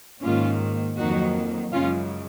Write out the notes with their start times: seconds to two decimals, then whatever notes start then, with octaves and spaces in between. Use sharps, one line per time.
0.21 G#2 D#3 A#3 C#4 F4
0.96 F2 D#3 F#3 A#3 D#4 F#4
1.72 F#2 C#3 G#3 C#4 F4